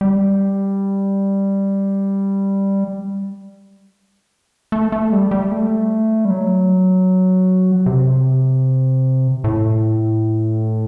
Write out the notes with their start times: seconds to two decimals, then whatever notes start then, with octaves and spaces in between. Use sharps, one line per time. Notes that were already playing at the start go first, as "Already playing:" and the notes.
0.01 G3
4.72 A3
4.92 A3
5.12 G3
5.31 G3
5.52 A3
6.25 G3
6.30 F#3
7.86 C3
9.44 A2